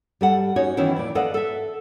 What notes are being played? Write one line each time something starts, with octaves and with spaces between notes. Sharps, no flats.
G3 A4 F#5
C#4 D#4 F#4 C#5
D#3 E3 B3 C#4 E4
F2 A#2 D5
A4 B4 D5 D#5 F5 F#5
A4 E5